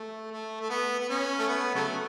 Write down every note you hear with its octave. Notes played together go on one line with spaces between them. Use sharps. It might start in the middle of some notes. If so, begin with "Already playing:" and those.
Already playing: A3
A3
A3
B3
B3
C#4
A3
B3
C#3 F#3 A3